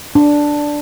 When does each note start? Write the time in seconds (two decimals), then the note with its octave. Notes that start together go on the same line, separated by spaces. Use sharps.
0.15 D4